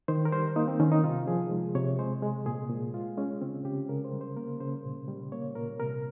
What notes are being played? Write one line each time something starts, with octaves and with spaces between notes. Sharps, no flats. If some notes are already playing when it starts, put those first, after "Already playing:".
D#3 C5
A#4
G3 C5
A#3 D#4
C4
D#3 C#4
D#4
C3 F4
F3 G#4
G#3
C3 C#5
G#3 C5
G#3
A#2 G#4
A#2
G#3 F4
G#3 C#4
C#3 C4
C#3 G4
C#3 A#4
C5
G3
C5
A#3 A#4
C#3 C5
A#2
G3
A#3 C#5
A#2 A#4
C3 A#4